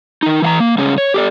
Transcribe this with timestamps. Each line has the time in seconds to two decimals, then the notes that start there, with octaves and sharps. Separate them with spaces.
0.23 D#3 D#4
0.42 E3 F5 A#5
0.60 A#3
0.78 G2 C#3 G#3 C#4
0.98 C#5
1.14 G4 A4 D5